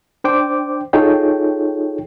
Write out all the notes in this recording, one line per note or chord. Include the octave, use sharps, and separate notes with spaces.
D4 C5 G5 D6
D#4 F4 G#4 A4 C#5 G5